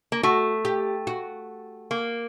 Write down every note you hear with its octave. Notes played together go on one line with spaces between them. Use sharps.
A#3
A3 F#4
G4
F#4
A#3